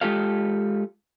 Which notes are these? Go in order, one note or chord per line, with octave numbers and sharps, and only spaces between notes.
G#3 F4 G4 A4 F5